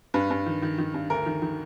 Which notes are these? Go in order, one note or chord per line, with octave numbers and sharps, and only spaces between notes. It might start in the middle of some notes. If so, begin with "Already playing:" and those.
G2 B4
G2
D#3
D#3
D#3
G2
D2 A#4
D#3
D#3